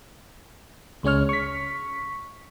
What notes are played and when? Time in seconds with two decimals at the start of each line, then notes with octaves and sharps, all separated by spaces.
1.03 C#2 G#3 C#4 C#5 F6
1.29 C#6 B6